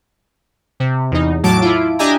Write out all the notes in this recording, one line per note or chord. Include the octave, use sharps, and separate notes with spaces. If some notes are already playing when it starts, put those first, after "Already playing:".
C3
E2 D#4
A2 F#3 A5 D6 D7
E4 F4
D4 G4 D#5 E5 G#5 A#5